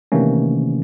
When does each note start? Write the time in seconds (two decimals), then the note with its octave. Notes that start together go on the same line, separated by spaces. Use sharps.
0.12 C3 D#3 E3 A3 A#3 C#4